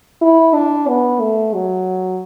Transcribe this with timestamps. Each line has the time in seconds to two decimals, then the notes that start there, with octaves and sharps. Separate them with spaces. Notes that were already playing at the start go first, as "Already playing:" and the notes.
0.22 E4
0.55 D4
0.88 B3
1.20 A3
1.54 F#3